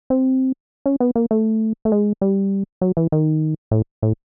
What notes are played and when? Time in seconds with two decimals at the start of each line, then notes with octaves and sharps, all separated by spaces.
0.10 C4
0.86 C#4
1.00 B3
1.16 A#3
1.31 A3
1.85 A3
1.92 G#3
2.21 G3
2.81 F#3
2.97 E3
3.12 D#3
3.71 A2
4.02 A2